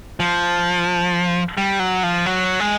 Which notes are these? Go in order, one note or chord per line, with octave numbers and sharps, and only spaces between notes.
F3
G3
F#3
F3
F#3
G#3